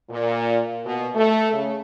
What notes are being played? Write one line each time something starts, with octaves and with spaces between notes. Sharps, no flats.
A#2
B2
A3
C#3